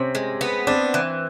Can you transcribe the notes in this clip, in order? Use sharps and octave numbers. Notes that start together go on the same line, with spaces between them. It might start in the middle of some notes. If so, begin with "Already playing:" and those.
Already playing: C3 C4 C#4
G#3
B3
C4 D4
E3